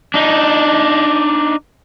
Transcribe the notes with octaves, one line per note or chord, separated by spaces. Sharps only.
D4 D#4